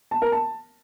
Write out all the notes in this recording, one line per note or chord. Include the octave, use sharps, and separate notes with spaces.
A5
A#4
A5